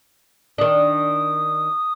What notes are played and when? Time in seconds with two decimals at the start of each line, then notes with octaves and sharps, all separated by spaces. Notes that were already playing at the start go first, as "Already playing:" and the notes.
0.58 D#3 D4 D#6